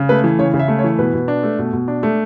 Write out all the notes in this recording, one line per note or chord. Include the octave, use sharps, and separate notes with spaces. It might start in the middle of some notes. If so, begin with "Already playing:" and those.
Already playing: C#3
A3 B4
E3
C#3 C#5
C#3
E5
A3
C#5
E3
B2 B4
B2
D4
A3
B2
B2
D4
A3